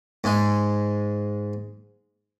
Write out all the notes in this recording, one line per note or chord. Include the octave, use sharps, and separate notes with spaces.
G#2 G#3